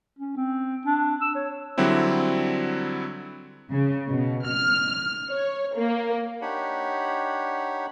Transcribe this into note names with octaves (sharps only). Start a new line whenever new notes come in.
C#4
C4
D4
E6
C#5
D3 F#3 G3 C4 E4
C#3
B2
F6
C#5
A#3
D4 D#4 G4 C#5 F#5 B5